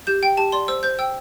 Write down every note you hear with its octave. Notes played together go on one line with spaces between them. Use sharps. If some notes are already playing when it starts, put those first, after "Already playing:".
G4 G6
G5
G4 A5
D5 C6
C5 E6
C5 G6
G5 E6